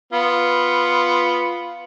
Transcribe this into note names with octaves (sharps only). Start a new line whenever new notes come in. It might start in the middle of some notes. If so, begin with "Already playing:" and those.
B3 F4